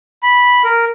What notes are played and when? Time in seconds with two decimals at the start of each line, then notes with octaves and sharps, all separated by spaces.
0.23 B5
0.64 A#4